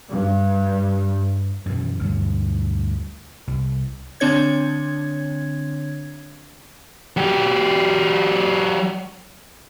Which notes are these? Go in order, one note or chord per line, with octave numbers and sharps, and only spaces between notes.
G2
F#2 B2 E3
D2 G2 F#3
C2
D3 C4 D4 C#5 G#6
F#3 G4